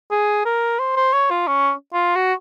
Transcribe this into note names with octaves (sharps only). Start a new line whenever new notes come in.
G#4
A#4
C5
C5
C#5
F4
C#4
F4
F#4